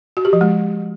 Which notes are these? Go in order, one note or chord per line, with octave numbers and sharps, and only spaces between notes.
F#4
G4
F3
G#3